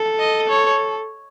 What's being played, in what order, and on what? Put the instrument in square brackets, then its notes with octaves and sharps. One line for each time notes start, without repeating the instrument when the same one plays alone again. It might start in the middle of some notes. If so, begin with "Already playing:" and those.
Already playing: [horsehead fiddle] A4
[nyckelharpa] D#5
C#5